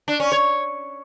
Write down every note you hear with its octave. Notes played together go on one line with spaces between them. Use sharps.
D4
C#4
C#5